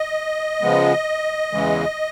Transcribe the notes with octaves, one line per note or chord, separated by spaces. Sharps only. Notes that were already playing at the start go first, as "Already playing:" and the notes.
Already playing: D#5
C#3 F3 G#3 B3
E2 C#3 E3 G#3